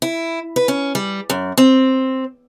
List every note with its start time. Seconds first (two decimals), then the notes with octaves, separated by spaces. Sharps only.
0.02 E4
0.56 B4
0.68 C#4
0.95 G3
1.30 F#2
1.58 C4